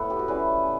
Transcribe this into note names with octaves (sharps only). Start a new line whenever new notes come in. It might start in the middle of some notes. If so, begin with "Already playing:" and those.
Already playing: A2 B3 A4 B4
G4
F#4
E3 G3 C#4 B4